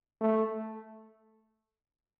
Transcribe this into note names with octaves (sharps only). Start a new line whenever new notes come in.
A3